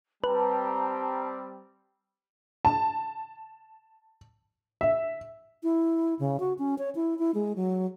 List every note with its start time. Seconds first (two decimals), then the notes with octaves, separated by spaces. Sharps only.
0.24 G3 C4 B4 A5 A#5
2.65 A5
4.81 E5
5.63 E4
6.19 C#3
6.40 F#4
6.59 C#4
6.79 C#5
6.95 E4
7.19 E4
7.35 G#3
7.56 F#3